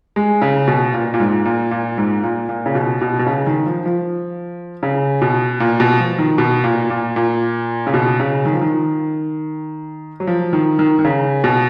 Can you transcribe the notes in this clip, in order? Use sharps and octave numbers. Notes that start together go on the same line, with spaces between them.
G#3
C#3
B2
A#2
A#2
G#2
A#2
A#2
G#2
A#2
A#2
C#3
B2
B2
B2
C#3
D#3
F3
F3
C#3
B2
A#2
B2
F3
D#3
B2
A#2
A#2
A#2
C#3
B2
C#3
D#3
F3
D#3
F#3
F3
D#3
D#3
D#3
C#3
B2